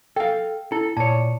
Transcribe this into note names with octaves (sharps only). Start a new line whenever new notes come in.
A4 F5 G5
E4 A4
A#2 C#5 A5